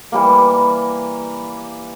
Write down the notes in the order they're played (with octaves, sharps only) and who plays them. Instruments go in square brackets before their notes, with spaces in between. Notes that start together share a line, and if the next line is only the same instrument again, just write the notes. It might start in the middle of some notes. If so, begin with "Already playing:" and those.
[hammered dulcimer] E3 G3 A#3